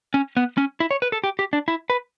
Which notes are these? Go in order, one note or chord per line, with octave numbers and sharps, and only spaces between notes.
C#4
B3
C#4
E4
C#5
B4
A4
G4
G4
D4
E4
B4